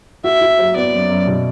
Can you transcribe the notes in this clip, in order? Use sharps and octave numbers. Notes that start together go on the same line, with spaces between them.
F#4 E5
F#4
F#3
B3 D5
F#2
F#2
B2